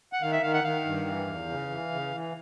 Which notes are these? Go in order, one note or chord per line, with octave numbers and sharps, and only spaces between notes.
F#5
D#3 F5
E5
D#3 F5
F#5
D#3 F5
G2
E3
E2
C#3
E3
C#3
E3